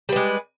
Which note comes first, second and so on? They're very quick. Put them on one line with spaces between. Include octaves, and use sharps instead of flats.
G3 B4 G#3